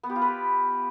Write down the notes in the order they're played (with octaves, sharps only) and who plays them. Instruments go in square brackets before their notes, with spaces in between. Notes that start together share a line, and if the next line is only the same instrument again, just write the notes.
[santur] B3
G4
F4
B4
G4